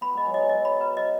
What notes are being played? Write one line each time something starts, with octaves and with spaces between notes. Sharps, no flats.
B3 B5
G#3 D#5
F#3
G#3 D#5
F#3 D#5
B5
B4
D#5